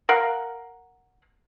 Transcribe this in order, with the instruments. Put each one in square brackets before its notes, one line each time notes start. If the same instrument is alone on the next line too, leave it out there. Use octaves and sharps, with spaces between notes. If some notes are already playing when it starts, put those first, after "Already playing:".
[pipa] A#4 F5 F#5